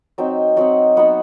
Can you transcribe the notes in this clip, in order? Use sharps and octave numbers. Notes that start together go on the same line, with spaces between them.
F#3 C4 D#4 G5
F#3 C4 D#4 F#5
F#3 B3 D#4 F#5